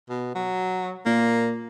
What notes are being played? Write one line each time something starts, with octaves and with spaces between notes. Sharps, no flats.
B2
F#3
A#2 A#3